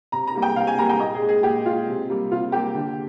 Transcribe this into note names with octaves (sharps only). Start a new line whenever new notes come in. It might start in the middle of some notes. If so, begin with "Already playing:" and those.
C3 A#5
A#5
G3 A#3
G5
C3 F5
G#5
G3 A#3 A#5
G5
A#2 D#5
G#4
G#3
G#4
A#2 G4
G#3 F4
C3
G3 A#3
C3 F4
G3 A#3 G4
D3